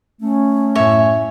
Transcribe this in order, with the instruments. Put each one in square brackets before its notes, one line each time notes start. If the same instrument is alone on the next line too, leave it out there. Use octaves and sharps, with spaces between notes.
[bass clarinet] A3 [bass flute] C#4
[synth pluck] F#2 A2 [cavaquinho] C#5 E5 G#5